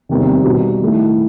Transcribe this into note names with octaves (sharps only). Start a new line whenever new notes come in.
E2 C3 D#3 G3 C4
B2 G3 D#4 F#4
D#3 A3 E4